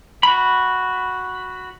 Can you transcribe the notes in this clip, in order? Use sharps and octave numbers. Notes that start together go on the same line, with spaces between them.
F#4 B5